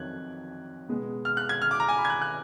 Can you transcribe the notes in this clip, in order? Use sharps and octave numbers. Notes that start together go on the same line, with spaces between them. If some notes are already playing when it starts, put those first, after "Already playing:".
Already playing: F2 D#3 F#3 F#6 G#6
B2 G#3 B3
F6
F#6
G#6
F6
D6
A#5
G#5
B5
G#6
F#6
F#6